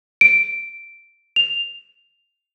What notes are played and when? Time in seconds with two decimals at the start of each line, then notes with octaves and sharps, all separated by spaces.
0.21 D7
1.36 F7